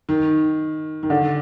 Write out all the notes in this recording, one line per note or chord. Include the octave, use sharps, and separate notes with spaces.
D#3
D#3
D3